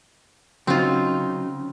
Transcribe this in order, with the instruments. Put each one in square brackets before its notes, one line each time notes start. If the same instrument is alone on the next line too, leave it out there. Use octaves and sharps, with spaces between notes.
[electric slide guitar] C#3 [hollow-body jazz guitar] F#3 D#4 [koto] C4 F4